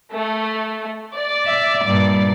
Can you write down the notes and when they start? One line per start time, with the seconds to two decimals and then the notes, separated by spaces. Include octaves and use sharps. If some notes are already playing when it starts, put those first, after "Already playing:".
0.12 A3
1.15 D5
1.46 E5
1.85 G2 A#2